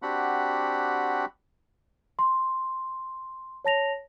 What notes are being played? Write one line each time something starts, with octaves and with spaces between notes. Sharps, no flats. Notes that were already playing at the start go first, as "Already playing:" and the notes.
C4 D4 F#4 G4 F#5 B5
C6
C#5 A5 A#6 F7